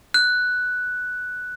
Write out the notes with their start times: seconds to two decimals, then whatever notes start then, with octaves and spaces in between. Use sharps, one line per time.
0.14 F#6